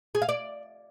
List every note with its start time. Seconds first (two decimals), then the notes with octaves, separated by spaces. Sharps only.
0.15 G#4
0.22 F5
0.29 D5